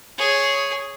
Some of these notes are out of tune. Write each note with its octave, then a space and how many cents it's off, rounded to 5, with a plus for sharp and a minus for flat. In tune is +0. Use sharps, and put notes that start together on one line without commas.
G#4 +0 C#5 +0